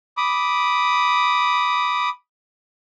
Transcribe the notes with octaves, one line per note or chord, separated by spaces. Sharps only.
B5 D6 D#6